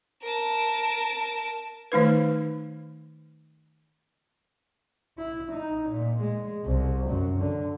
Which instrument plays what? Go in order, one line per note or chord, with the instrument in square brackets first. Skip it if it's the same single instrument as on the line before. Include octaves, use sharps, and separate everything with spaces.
[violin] A#4 A5
[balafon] D#3 A3 D#4 B4
[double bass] E4
D#4
A#2
G#3
C2
F#2
D3